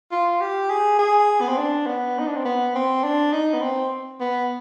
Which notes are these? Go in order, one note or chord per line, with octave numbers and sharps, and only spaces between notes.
F4
G4
G#4
G#4
B3
C4
D4
B3
D#4
D4
C4
B3
C4
D4
D#4
B3
C4
B3